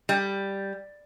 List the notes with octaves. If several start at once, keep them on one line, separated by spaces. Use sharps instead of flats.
G3